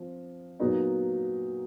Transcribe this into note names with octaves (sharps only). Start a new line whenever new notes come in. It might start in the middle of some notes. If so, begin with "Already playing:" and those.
Already playing: F3 C4
A#2 F#3 B3 D#4